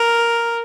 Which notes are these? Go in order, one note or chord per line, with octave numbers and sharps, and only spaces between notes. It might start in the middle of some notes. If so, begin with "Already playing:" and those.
Already playing: A#4